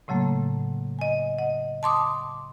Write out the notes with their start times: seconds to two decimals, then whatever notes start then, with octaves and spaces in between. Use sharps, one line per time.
0.08 A2 C#3 F#3 A3 A#3
0.99 D#5 G#5
1.39 D#5 F#5
1.83 A5 C6 D6 D#6